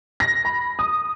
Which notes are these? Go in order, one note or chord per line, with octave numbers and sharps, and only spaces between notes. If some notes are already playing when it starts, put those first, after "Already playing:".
A#6
B5
D#6